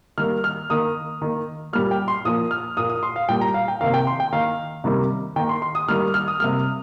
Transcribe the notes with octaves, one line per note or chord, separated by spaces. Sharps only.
D#3 G3 A#3 F6
F6
D#3 A#3 D#6
D#3 A#3
A#2 G3 A#3 F6
G5
C6
A#2 F3 A#3 D#6
F6
A#2 A#3 D#6
D#6
C6
F5
A#2 G3 A#3 G5
A#5
F5
G5
C3 D#3 A#3 F5
G5
C6
G5
D#3 A#3 F5
C3 D#3 G3 A#3
D#3 A#3 G5
C6
C6
D#6
D#3 G3 A#3 F6
F6
D#6
C3 G3 A#3 F6